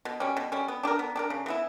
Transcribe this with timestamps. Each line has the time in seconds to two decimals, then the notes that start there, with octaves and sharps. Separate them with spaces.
0.05 B2
0.20 G3 C#4
0.37 B2
0.52 G3 C#4
0.68 B3
0.83 D4 G4 A#4
0.99 B3
1.16 D4 G4 A#4
1.30 C#3
1.46 E3 B3 E4